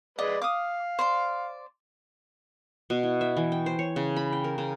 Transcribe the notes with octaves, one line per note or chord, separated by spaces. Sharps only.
G#3 B4 D5 D#5
F5 D6 D#6
C5 D5 C6
B2
E4
E5
E3
G5
C5
C#5
C#3
B5
G5
A#4
C#3